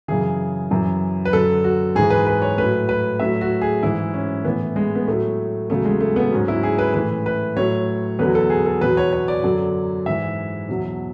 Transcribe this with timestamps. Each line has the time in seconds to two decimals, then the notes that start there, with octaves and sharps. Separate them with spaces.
0.08 F#2 C#3 E3 G#4
0.71 F#2 E3
1.25 B4
1.33 F#2 D3 F#3 A4
1.64 F#4
1.95 G#2 E3 G#4
2.10 B4
2.27 B4
2.42 C#5
2.58 A2 F#3 B4
2.89 B4
3.20 A2 F#3 E5
3.41 F#4
3.62 G#4
3.83 G#2 E3 E4
4.14 C#4
4.45 A2 E3 B3
4.76 G#3
4.95 B3
5.07 A2 F#3 A3
5.70 E2 C#3 F#3 A3
5.85 G#3
6.00 A3
6.16 B3
6.31 G#2 F#3 C#4
6.48 E4
6.63 G#4
6.78 B4
6.94 A2 E3 B4
7.26 B4
7.57 A2 F#3 C#5
8.19 E2 D3 F#3 B4
8.35 A4
8.50 G#4
8.66 A4
8.81 E2 B2 F#3 B4
8.97 C#5
9.13 C#5
9.28 D5
9.43 F#2 D3 F#3
10.06 G#2 E3 E5
10.69 E2 B2 F#3